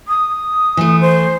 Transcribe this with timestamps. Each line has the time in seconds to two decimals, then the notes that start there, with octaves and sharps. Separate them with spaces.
0.08 D#6
0.77 E3 A3
1.01 C5